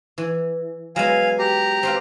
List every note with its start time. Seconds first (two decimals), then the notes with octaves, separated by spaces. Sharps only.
0.18 E3
0.96 F#3 G#3 B3 F5 G#5
1.39 G4 A#5
1.83 C4 B4 F5